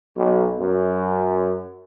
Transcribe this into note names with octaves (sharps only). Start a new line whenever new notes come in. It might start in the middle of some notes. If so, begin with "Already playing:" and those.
B1
F#2